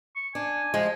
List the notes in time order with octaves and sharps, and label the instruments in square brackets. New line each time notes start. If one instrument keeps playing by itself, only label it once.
[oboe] C#6
[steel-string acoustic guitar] D4 [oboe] G#5
[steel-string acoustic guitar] F3 G#3